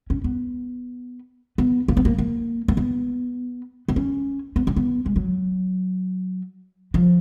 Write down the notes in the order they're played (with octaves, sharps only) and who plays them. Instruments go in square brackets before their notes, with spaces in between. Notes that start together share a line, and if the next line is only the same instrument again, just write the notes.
[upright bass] C#4
B3
B3
A#3
B3
A#3
A#3
A#3
B3
B3
C#4
B3
C#4
B3
G#3
F#3
F3